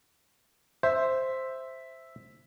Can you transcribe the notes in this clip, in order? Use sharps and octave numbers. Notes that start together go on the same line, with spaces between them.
C5 E5